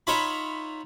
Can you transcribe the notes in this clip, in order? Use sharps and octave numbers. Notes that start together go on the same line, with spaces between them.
D#4 F4 C#5 E5 B5